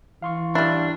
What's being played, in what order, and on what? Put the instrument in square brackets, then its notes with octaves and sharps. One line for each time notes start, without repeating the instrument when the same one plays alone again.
[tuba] E3 [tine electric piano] F5 C6 C#6
[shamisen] G3 E4 [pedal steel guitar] D4